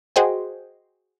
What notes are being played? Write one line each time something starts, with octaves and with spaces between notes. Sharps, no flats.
F#4 G#4 C5 D#5 G5